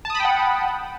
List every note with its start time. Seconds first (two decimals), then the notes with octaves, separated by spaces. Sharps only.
0.05 A5
0.10 D#6
0.15 B5
0.20 G5
0.25 F#5